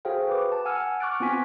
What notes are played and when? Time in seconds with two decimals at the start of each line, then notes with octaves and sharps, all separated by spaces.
0.05 F#4 G#4 A4 C5 F5 G5
0.29 B4 D6
0.52 A5
0.65 F#5 G#5 E6 F6
1.00 C#6 D6 F6 F#6 A6 D7
1.20 B3 C4 F4 G#5 B6